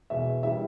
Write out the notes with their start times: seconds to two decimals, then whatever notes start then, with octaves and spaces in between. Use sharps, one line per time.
0.10 E2 B2 G#3 E5
0.43 E3 G3 E5